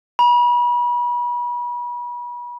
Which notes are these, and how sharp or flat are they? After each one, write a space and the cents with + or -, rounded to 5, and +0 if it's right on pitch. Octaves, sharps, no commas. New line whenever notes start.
B5 -35